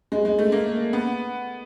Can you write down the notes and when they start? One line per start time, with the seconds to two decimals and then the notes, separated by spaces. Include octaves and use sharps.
0.12 G#3
0.25 G#3
0.39 A3
0.52 A#3
0.93 B3